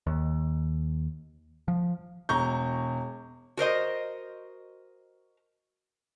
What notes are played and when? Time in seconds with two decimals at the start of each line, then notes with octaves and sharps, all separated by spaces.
0.07 D#2
1.68 F3
2.29 E1 A#5 C#6 G6
3.57 F#4 A#4 C5 D#5